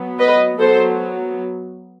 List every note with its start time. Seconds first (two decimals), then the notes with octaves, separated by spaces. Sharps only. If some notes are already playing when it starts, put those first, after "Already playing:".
Already playing: F#3 B3
0.19 B4 D#5
0.59 F#3 B3 A4 C5